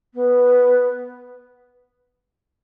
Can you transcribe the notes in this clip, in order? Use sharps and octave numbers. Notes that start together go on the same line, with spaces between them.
B3